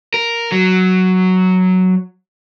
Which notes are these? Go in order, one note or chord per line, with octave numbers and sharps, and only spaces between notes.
A#4
F#3